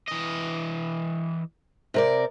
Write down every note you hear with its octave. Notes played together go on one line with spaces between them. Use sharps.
E3 D#5
C3 A#4 D5